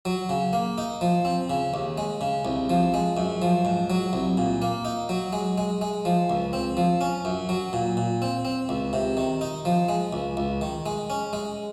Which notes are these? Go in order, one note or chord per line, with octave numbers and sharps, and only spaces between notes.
F#3
C#3
A#3
D#4
F3
C4
C#3
D#2
G#3
C#3
C2
F3
G#3
F#2
F3
G#2
F#3
C2
A#2
A#3
D#4
F#3
G#3
G#3
G#3
F3
C#2
C4
F3
C#4
F#2
F#3
A#2
A#2
C4
C4
C#2
C3
D#3
D#4
F3
G#3
C#2
C#2
D#3
G#3
C#4
G#3